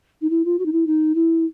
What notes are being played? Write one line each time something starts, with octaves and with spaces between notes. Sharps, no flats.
D#4
E4
F4
F#4
D#4
E4
D#4
E4